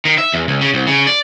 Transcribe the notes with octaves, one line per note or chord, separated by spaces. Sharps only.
D#3
E5
E2
C#2
C#3
C2
C#3
D5